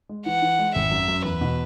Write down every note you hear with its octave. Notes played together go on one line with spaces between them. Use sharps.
G#3
E3 F#5
E3
G#3
G#1 E5
F#2
F#2
E2 B4
B2